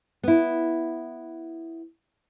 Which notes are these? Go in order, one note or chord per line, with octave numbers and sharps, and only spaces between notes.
B3 E4